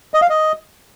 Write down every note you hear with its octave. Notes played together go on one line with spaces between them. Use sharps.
D#5
F5
D#5